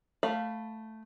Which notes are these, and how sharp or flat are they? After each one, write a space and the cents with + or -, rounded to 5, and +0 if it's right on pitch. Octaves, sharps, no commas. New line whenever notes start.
A3 +0 F5 +10 B5 +0